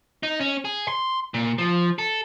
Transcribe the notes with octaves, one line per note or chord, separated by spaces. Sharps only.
D#4
C#4
G#4
C6
A#2
F3
A4